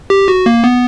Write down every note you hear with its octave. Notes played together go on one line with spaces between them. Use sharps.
G4
F#4
A#3
B3